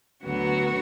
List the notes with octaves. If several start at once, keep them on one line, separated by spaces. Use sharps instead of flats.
D2 D3 F#3 B3 F#4